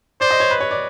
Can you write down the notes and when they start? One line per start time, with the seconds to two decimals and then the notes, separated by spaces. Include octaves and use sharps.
0.21 C5 D5
0.31 D#5
0.40 C#5
0.51 B4
0.61 C#5
0.71 D5